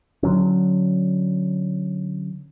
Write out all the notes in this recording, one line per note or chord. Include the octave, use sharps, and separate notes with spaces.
D3 F#3 C#4